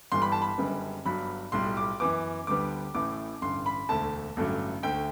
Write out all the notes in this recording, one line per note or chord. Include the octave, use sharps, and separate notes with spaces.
G1 G2 E3 G3 C6
B5
A5
B5
F#1 F#2 D3 G3 B3
G1 G2 F#3 B5
B1 A2 G3 C6
D6
F#2 E3 B3 D6
D2 D3 G3 B3 D6
A1 A2 E3 A3 D6
A1 G2 D3 C6
B5
E1 D2 D3 A3 A5
A1 G2 D3 F#3 A3
D2 D3 A3 G5